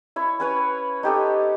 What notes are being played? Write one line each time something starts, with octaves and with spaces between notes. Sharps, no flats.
E4 C#5
C#4 B4 C#5
D#4 G4 A4